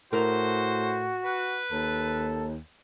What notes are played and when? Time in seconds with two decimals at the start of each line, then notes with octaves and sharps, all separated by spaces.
0.13 A2 F#4 A#4 C5
1.25 B4
1.71 D#2 A4